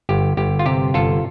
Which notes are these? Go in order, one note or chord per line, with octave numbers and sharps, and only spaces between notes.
G1 G4
G1 G4
F4
C3 G4
G1 F4 A4